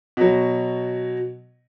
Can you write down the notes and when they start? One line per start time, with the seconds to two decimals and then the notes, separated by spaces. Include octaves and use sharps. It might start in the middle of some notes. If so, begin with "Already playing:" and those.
0.17 B2 F#3